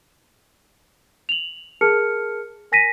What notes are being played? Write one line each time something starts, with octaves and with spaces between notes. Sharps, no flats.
F7 F#7
G#4 A#4 A5 F6 C#7
A#4 G#5 A#6 B6 D#7